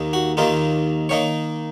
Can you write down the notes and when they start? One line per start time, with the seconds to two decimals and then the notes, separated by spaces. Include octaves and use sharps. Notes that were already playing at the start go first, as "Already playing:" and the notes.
Already playing: D#2 D#3 A#3 D#4
0.13 F#4
0.37 D#2 D#3 A#3 D#4 F4
1.09 D#3 A#3 D#4 C#5